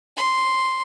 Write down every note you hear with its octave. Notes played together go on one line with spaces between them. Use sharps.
C6